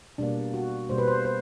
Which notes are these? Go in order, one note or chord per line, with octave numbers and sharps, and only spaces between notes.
B2 G3 A#3 D4
F#4
B2 G3 A#3 C5
B4
C5
C5